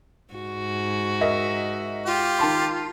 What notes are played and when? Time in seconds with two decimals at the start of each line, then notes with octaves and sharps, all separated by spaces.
0.33 G#2 F#4
1.21 A#4 D#5 E5
2.06 F4 G4
2.39 D#3 A5 C6